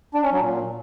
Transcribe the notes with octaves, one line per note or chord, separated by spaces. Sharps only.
D4
C#4
F#3
A#2